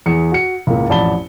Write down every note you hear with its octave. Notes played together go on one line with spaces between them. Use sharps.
E2 G#4 C#7
F#4 C#7
C#2 A2 A#3
A1 F2 D5 A5 B5 G7